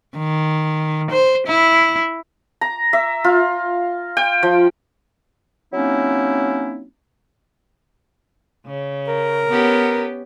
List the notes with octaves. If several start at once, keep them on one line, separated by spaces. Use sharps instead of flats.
D#3
C5
E4
A#5
E5
F4
G5
F3
F#3 A#3 C4 C#4 D#4 E4
C#3
A#4
B3 C#4 G4